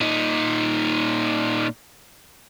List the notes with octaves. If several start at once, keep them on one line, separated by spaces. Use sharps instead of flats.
A#2 D#4